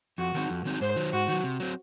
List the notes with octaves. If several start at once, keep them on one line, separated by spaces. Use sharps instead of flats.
F2 F#4
D#3 F#3 C4 D#4
F2
D#3 F#3 C4 D#4
G#2 C5
D#3 F#3
G#2 F#4
D#3 F#3
C3
F#3 C4